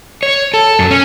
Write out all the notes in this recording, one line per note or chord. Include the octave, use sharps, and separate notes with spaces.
C#5
A4
F#2
C#4